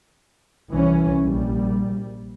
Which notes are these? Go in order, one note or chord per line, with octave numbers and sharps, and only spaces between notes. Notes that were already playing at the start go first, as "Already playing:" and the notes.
C2 E3 C#4
A#1 G3